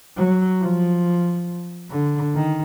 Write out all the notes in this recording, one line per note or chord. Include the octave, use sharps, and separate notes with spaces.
F#3
F3
D3
D#3